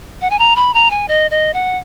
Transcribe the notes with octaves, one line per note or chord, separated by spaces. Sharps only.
F#5
G#5
A#5
B5
A#5
G#5
D#5
D#5
F#5